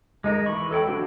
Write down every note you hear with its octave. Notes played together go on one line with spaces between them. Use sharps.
G#3 D#4 A#4
E3 B5 C#6
A4 C#5 G5 B5
F3 A3 D4 F#4